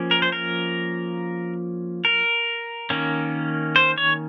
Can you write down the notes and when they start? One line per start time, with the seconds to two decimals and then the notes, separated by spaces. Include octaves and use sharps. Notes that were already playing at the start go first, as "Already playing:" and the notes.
Already playing: F3 A#3 C#4
0.11 A#4
0.22 C5
0.32 A#4
2.05 A#4
2.90 D#3 A#3 C#4
3.76 C5
3.98 C#5